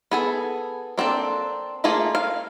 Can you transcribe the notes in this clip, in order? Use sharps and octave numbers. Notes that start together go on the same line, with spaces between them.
B3 G#4 A4
A#3 C4 D4 A4
A3 A#3 F4 G#4
F5